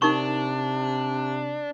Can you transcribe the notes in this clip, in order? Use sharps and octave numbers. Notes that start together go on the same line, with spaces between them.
C3 D4 D#4 A#4 C#6